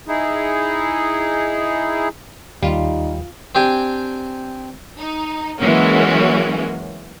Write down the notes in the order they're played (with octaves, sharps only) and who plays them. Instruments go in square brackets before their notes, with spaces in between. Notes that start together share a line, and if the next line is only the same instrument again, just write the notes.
[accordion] D#4 E4 G#4
[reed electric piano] D#2 [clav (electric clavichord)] G3 [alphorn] D#4 [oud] F4
[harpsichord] C4 D4 G4 G#5
[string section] D#4
E3 F#3 G#3 A#3 C#4 F#4